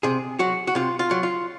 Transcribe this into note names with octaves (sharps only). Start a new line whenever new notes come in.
C3 G#4
F#3 F#4
F#4
C3 F4
F4
F#3
F4